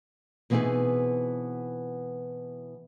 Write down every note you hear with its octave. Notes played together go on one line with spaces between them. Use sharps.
B2 E3 B3 C4 D#4 G#4